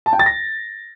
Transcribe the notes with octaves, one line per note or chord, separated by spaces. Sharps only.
A5
G5
A6
A#6